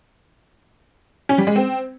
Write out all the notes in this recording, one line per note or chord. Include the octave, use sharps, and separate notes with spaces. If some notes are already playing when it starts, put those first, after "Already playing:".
C#4
G3
G#3
C4